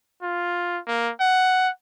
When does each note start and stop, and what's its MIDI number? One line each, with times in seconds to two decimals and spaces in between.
0.23 0.79 65
0.88 1.11 58
1.21 1.69 78